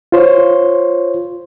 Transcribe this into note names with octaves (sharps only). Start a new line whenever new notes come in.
F4 C5 C#5